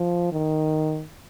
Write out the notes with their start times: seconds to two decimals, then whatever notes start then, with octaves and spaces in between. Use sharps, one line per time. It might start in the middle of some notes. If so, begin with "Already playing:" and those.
Already playing: F3
0.32 D#3